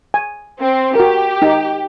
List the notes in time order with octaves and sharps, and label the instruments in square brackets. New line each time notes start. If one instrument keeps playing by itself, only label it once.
[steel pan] G#5
[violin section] C4
[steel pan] F#4 A#4 [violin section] G4
[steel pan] D#4 G5